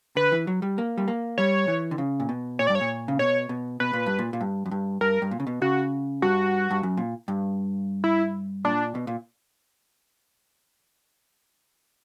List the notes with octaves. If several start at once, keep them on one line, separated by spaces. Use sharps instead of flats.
D3 B4
E3
F#3
G3
A#3
G3
A#3
G3 C#5
E3
D3
C#3
A#2
B2
A#2 C#5
G2 D5
C#5
A#2
C#3
B2 C#5
B2
B2 B4
A#2
G2
A#2
A#2
G2
F#2
G2
G2 A#4
G2
A#2
C#3
B2
C#3 F#4
G2 F#4
G2
F#2
A#2
G2
E4
A#2 D4
B2
A#2